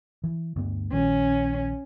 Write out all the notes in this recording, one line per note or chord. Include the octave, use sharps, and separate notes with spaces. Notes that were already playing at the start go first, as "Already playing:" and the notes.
E3
D2 G2 B3
A#1 D#3 G3 C#4